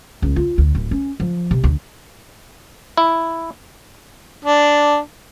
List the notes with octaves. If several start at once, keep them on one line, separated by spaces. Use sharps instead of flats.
C#2
F4
D2
D1
C#4
F3
C3
D2
E4
D4